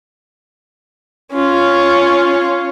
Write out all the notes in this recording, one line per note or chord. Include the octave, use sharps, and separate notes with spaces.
C#4 F4